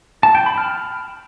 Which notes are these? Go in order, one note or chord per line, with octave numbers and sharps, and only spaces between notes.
A5
G5
B5
F6